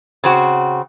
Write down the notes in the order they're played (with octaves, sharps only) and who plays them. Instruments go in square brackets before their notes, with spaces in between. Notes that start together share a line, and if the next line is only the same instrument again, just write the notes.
[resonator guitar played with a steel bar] C#3 C4 F#4